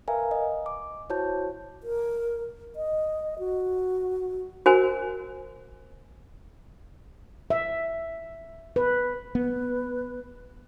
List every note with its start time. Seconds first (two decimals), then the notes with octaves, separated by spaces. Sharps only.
0.08 A#4 B4 E5 F5 G#5 A#5
0.31 D#5
0.66 D6
1.10 E4 F#4 C5 C#5 A5 G6
1.83 A#4
2.76 D#5
3.39 F#4
4.66 F#4 A#4 C5 G#5
7.50 E5
8.76 B4
9.35 B3 B4